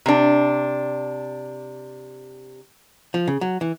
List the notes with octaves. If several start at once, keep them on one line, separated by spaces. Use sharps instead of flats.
C3 D4
F3
C#3
F#3
E3